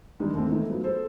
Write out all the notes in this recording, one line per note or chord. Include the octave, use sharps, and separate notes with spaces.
D#3 G3 G#3 D4 D#4
D#2 A3 C4
E3 A3 B3 D#4 E4
F3 F#3 B3
G#4 A4 C5